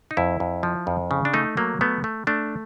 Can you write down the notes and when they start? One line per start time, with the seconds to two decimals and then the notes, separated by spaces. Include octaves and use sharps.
0.11 D#4
0.17 F2 E4
0.40 F2
0.63 F3
0.87 F2
1.11 C#3
1.25 D4
1.34 A3 D#4
1.57 F#3 A#3
1.81 A3 B3
2.04 A3
2.27 A3 D4